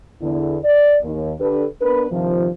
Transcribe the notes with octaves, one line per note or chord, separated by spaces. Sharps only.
E2 D3 E4
D5
D#2
D3 D4 G4 A4 B4
B3 D4 A#4 B4
G2 C3 D#3 F3